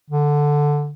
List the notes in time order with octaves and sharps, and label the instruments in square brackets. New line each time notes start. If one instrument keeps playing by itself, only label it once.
[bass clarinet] D3